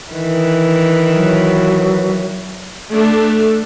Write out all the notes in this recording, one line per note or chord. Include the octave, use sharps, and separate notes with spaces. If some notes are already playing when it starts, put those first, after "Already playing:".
D#3 E3 B4
F#3
A3 D4 A4